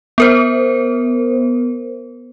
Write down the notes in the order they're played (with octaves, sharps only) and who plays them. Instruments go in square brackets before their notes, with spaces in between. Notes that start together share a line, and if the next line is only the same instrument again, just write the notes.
[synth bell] B3 A#4 C5